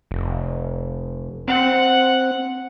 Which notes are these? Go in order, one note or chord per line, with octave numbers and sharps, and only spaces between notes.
F1
C4 F#5